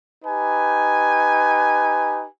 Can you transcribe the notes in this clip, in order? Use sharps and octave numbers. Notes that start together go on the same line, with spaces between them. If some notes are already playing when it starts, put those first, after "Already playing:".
D#4 G4 B4 G#5